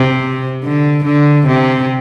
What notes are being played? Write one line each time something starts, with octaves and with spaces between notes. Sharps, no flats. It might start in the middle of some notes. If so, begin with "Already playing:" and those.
Already playing: C3
D3
D3
C3